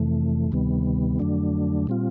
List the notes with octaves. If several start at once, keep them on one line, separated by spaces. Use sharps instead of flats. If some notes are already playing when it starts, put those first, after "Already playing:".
Already playing: F2 C3 E3 A3
D2 C3 D#3 G3 B3
F2 D3 F#3 A3 D4
A#2 G3 C4 F4